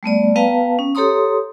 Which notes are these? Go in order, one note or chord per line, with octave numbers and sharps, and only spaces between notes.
G3 A3 B3 D5
B3 B4 F5 G5 A5 A#5
C#4
G4 A4 C#5 A#5 C6 D#6